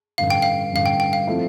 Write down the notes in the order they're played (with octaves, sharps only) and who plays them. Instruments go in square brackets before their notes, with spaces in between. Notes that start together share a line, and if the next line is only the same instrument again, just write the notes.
[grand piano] A1 G2 D3 [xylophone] F5
[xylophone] G5
F5
[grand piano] A1 G2 D3 [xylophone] F5
[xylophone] G5
G5
F5
[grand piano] F3 A3 C4 E4